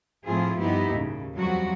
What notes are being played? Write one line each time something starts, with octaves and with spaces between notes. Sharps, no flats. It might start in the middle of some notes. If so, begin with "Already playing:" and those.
A2 F3 C4 E4 F4 G#4
G2 B3 D#4 E4 G4
D#2 A2 C#3
F2 F#3 G3 F#4